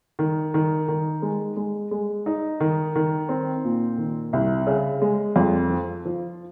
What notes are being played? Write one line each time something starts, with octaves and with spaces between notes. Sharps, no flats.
D#3
D#3
D#3
G#3
G#3
G#3
D#4
D#3
D#3
C4
A#2
D#3
C2
C#3
G#3
F2
F3
F3